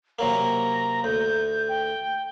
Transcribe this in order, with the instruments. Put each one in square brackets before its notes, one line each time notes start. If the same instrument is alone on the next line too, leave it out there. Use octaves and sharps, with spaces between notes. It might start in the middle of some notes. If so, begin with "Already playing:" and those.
[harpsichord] C3 F#3 A#3 [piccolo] A#5
[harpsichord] D2 [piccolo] G6
[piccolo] G5